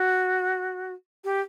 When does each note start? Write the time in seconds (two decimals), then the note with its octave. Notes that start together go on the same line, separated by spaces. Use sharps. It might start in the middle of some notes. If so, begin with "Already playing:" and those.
Already playing: F#4
1.24 G4